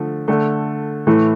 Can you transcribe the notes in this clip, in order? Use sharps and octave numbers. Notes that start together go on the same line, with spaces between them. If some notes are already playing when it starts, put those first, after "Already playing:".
Already playing: D3 F3 A3
D3 A3
A2 E3 A3